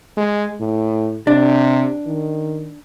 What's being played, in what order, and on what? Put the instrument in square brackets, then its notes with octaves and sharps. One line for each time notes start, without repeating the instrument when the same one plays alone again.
[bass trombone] G#3
A2
[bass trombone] C3 [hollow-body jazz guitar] D4
[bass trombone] D#3